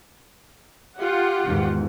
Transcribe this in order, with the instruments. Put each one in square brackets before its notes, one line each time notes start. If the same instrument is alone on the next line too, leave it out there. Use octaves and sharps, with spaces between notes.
[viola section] F4 G4 F#5
[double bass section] E2 G#2 D#3